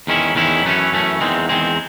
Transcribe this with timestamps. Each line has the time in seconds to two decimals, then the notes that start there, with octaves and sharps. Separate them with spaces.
0.07 E2 D#3 G#3 C#4 E4
0.35 E2 D#3 G#3 C#4 E4
0.65 F#2 E3 A3 C#4
0.92 F#2 E3 A3 C#4
1.20 E2 D#3 G#3 C4
1.49 E2 D#3 G#3 C4